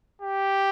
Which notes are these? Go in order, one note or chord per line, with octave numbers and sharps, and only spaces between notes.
G4